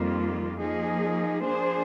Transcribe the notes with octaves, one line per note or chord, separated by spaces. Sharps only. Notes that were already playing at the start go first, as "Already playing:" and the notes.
Already playing: F2 D#3 G3 A#3 F4
F3 A#3 D#4 G#4
F3 A#3 D4 G#4 C5